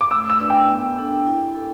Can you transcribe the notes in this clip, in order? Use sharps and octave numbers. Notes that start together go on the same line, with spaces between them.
D6
A3 E6
E6
D4 B4 D5
G5
B3
D4 A4
E4
A4